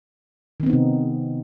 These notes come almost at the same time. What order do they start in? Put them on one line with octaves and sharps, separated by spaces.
D#3 C4 B3 D#4 C3